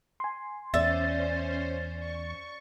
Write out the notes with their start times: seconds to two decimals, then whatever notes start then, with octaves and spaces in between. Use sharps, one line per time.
0.20 G#5 C6
0.74 E2 C#4 C5 D5 E5 A6
1.99 C#6